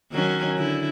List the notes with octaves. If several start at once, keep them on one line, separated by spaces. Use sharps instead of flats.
D#3 F#3 C#4
D3 E4